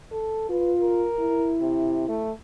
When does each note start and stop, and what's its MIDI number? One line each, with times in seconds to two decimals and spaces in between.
0.12 0.49 69
0.50 1.06 65
0.50 0.72 71
0.80 1.56 70
1.19 2.28 64
1.62 2.05 48
2.08 2.31 57